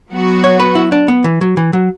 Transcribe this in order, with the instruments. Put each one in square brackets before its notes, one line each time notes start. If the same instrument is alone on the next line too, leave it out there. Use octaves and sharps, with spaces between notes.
[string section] F#3 B3 F#4
[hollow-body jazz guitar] C#5
B4
E4
D4
B3
E3
F#3
E3
F#3